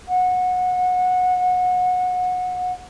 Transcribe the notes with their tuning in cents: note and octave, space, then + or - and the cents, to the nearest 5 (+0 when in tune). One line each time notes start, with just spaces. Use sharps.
F#5 -25